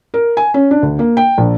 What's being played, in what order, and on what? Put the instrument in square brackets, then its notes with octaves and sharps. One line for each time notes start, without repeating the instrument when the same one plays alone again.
[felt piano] A#4
G#5
C#4
D4
D2
A#3
G5
A#1